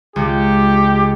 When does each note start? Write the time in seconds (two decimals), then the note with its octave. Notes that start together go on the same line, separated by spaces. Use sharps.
0.16 C#2 G4